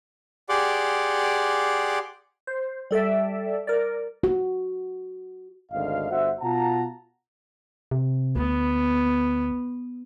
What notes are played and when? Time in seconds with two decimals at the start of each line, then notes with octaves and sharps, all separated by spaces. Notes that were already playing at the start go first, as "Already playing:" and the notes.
0.49 G4 G#4 D5 F#5 C6 D6
2.47 C5
2.91 G3 A4 D5 E5
3.67 A#4 D5
4.24 F#4
5.72 G#1 D2 D#5 F5
6.12 G1 F#4 C5 E5 F#5
6.41 B2 F4 F#5 A5 A#5
7.91 C3
8.36 D2 B3